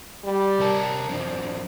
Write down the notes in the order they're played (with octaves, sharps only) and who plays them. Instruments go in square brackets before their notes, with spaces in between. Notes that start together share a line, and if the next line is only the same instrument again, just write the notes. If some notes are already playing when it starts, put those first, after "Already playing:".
[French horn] G3
[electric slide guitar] C3 A#4 A5
[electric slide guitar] F#2 C4 [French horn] D4